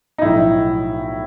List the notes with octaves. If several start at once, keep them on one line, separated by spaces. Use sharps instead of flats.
D#4
B1 A2 F3 E4